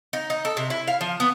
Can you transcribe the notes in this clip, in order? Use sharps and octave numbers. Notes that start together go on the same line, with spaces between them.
D#4
D#4
A4
C3
E4
F5
F3
B3